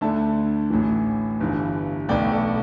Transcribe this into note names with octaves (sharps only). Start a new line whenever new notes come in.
D2 D3 A3 D4 E5 A5
A1 A2 E3
G1 G2 E3
B1 B2 A3 D5 G5
A4 D5